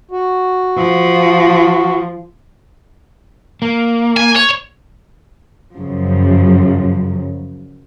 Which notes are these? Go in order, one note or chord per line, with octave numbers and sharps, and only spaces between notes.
F#4
F3
A#3
G#5
C#5
F#2 C#3 F3